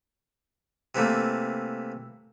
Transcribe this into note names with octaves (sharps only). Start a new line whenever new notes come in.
C3 E3 A3 A#3